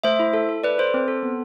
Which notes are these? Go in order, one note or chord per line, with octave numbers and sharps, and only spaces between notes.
A3 C5 E5
E4
A4
A4
A4 B4 D5
A4 C5
C4
A4
B3